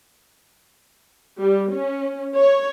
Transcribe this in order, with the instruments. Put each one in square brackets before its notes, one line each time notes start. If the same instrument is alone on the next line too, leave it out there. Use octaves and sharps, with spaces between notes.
[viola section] G3
C#4
C#5